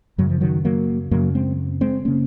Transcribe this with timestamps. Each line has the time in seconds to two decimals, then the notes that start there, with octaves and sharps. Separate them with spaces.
0.18 F#2 C#3 F#3
0.30 F3
0.41 D#3 F#3
0.65 F#3 A#3
1.11 F#2 C#3 F#3 A#3
1.35 G#3 C4
1.81 G#3 C4
2.05 C#3 A#3 C#4